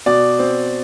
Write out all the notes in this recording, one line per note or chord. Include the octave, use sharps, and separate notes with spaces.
B2 D5
C4